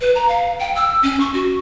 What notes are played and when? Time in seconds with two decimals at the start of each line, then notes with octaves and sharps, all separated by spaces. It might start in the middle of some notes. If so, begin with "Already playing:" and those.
0.01 B4
0.15 A#5
0.28 F5
0.59 G5
0.75 E6
1.03 C#4
1.20 C#6
1.34 F#4